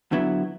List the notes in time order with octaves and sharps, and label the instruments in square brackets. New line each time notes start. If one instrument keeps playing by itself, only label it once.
[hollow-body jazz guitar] D3 F#3 B3 E4